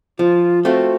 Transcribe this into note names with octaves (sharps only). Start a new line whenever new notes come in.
F3 F4
A3 C4 F4 F#4